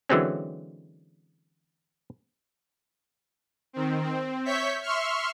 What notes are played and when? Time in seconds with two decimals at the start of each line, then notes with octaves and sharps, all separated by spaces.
0.09 D3 E3 F#3 G#3 C4 C#4
3.73 D#3 C4
4.03 C4
4.45 C#5 E5 C#6 G6 B6
4.82 E5 C6 C#6 F6